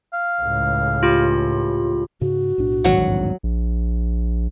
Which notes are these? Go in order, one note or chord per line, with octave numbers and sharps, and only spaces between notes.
F5
C#2 A2
F4 G4 B5
G#2 C#3 F#4
B1 A2 D4
G#1 E2 G2 F#3 F#5
A#1